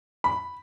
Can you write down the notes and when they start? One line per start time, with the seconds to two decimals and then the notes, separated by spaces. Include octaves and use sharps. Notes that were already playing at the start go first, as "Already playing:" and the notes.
0.24 B5